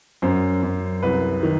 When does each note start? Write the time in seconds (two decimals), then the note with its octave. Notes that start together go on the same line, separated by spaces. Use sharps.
0.22 F#2 C5
0.62 F#2
1.03 C2 B4
1.43 D#3